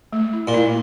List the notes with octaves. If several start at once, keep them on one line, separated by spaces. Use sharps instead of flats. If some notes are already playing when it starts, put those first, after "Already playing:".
A3
E4
A#2
E4